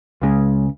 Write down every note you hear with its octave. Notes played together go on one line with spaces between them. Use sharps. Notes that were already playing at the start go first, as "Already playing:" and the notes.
C#2 C#3 G#3